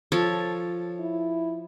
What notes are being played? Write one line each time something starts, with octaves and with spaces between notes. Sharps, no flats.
F3 A4 C#5
E4